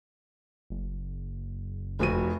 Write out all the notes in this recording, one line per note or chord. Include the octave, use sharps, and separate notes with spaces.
F#1
F1 F2 F#4 D#7